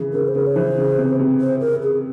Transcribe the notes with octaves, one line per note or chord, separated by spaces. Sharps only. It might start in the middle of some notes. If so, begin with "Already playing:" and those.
Already playing: C#3 E3
C#3 A#4
C5
C#3 A#4
C#5
E3 C5
C#3
C3
C3
C5
A#4
G#4